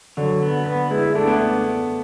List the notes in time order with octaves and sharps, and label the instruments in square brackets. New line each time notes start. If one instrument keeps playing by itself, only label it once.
[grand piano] D3 [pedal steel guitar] F#3
[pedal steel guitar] B3
B3
[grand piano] G#3 [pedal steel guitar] E4
[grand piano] A3 [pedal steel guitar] D4
[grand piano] B3